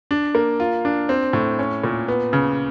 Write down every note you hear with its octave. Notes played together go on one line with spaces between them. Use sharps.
D4
A#3
F4
D4
C4
A2
C#4
A#2
B3
C#3